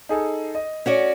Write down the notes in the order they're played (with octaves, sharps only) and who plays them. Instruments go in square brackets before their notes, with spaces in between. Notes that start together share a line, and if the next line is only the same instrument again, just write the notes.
[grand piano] D#4 G#4 A4
D#5
[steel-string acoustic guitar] C#4 F#4 D5